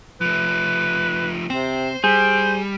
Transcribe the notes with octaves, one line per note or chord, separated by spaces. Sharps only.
F3 A3 B4
C3 C4 C5
G3 G#4 C5